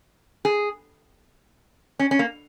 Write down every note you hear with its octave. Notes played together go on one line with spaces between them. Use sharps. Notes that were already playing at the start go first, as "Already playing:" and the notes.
G#4
C#4
C#4
A#3